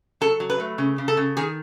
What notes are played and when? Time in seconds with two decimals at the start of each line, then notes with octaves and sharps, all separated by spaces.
0.21 F#3 A4
0.40 F#3
0.50 B4
0.60 A3
0.78 C#3
0.98 C#3
1.08 A4
1.17 C#3
1.37 D#3 G#4